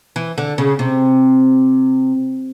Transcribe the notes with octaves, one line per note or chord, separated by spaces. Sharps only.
E3
D3
C#3
C3